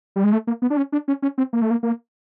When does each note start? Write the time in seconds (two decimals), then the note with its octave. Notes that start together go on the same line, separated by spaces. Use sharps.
0.16 G3
0.24 G#3
0.33 A3
0.47 A#3
0.62 B3
0.70 D4
0.77 C#4
0.92 D4
1.08 C#4
1.22 C#4
1.38 C4
1.53 A#3
1.62 A3
1.71 A#3
1.83 A#3